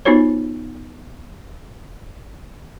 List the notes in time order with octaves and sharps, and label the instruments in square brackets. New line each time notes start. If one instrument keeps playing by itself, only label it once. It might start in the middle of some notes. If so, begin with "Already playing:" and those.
[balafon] B3 D#4 F4 F#4 C5 C#5